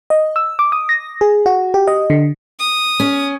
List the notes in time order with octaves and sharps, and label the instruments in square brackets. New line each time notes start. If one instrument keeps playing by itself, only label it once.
[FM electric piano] D#5
E6
D6
D#6
A#6
G#4
F#4
G4
D#5
D3
[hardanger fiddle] D#6
[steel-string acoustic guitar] C#4